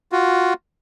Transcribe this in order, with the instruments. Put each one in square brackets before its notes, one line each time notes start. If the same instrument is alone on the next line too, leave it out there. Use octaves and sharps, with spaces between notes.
[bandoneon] F4 F#4